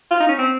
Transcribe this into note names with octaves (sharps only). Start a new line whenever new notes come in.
F4
D#4
C#4
C4